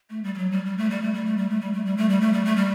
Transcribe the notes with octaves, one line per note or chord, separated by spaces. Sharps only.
A3
G3
G3
F#3
G3
G3
A3
G3
A3
G3
A3
G3
A3
G3
A3
G3
A3
G3
A3
G3
A3
G3